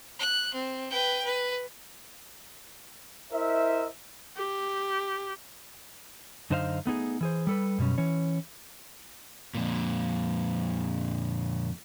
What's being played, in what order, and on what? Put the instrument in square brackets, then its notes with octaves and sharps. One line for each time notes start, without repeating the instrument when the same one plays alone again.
[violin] F#6
C4
B4 G5
B4
[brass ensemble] E4 A#4 C5 D#5 E5
[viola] G4
[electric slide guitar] F#2 D3 D#4 C5 D#5 F5
A3 B3 D#4 G#4
E3 G#4 C5
G3 A4 B4
F#2 B2 G3 C#4
E3 C#4 C#5
[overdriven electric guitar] F2 A#2